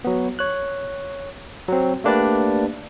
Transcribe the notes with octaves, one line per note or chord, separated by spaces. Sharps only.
F#3 B3
C#5 F#6
F#3 C4
A3 A#3 D4 G4 B4 D5